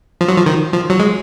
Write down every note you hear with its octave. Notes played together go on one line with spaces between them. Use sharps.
F3
F#3
F3
D#3
F3
F#3
G#3